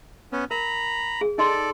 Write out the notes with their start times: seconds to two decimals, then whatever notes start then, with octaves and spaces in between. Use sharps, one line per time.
0.32 B3 C#4
0.51 A#4 A#5 B5
1.21 G#4
1.38 D#4 A4 D5 D#5 C6